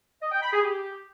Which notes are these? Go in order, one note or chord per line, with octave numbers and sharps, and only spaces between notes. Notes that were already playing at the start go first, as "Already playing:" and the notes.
D#5
G5
B5
G#4
G4